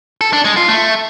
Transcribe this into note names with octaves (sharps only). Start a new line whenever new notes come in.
A4
D4
G#3
F4
A3